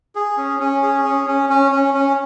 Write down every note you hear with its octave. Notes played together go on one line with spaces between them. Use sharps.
G#4
C#4
C#4
G#4
C#4
C#4
C#4
C#4
C#4